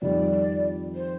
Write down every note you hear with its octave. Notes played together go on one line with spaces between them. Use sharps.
F2 D#3 G3 D5
C5